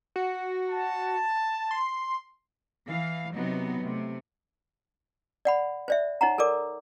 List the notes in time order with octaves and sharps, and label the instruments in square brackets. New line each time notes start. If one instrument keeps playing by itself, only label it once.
[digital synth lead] F#4
[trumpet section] A5
[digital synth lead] C6
[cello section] E3 F5
C3 F#3 B3 D#4
C3 A3
[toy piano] D5 F#5 B5
C5 D5 E5
D#4 C#5 F#5 A#5
A4 A#4 D5 D6